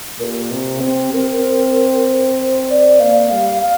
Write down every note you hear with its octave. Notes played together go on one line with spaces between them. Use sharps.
A#2 G4 A#4
C3
C4
C4 A#4
C5
D5
A#3 F5
G3 F5
F5